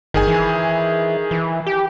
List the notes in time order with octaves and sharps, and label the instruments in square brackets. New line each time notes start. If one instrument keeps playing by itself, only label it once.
[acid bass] G1 [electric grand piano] D#3 G#4 G#5
[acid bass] E3
E3
G4